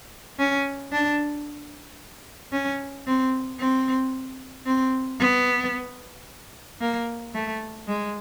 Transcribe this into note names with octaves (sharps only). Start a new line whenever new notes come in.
C#4
D4
C#4
C4
C4
C4
B3
A#3
A3
G#3